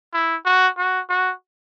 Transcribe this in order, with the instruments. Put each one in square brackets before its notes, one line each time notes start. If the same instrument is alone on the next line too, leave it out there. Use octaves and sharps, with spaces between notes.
[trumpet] E4
F#4
F#4
F#4